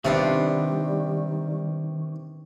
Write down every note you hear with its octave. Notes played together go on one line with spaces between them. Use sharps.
C3 D#3 G3 B3 D4 F4